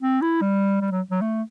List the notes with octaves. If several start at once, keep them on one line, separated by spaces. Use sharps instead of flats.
C4
E4
G3
G3
F#3
F#3
A3